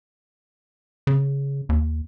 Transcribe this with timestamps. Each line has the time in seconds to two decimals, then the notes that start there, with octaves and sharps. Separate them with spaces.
1.07 C#3
1.69 D#2